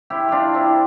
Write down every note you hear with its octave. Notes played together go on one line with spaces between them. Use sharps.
C3 E4 G4
G3 D4 F4 G4
C3 C4 E4